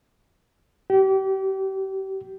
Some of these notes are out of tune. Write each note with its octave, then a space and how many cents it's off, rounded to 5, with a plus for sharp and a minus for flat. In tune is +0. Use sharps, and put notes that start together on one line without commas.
G4 -30